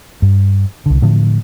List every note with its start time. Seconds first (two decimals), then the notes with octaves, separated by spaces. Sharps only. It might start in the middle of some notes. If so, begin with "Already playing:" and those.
0.22 G2
0.86 C2 D3
1.02 A2 D3 F3